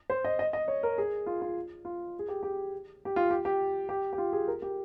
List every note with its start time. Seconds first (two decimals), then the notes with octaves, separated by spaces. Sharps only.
0.10 C5
0.25 D#5
0.39 D#5
0.53 D#5
0.68 C#5
0.83 A#4
0.98 G#4
1.26 F4
1.42 F4
1.85 F4
2.19 G#4
2.28 G4
2.43 G4
3.05 G4
3.16 F4
3.31 G4
3.45 G4
3.89 G4
4.13 G4
4.18 F4
4.33 G#4
4.48 A#4
4.62 G4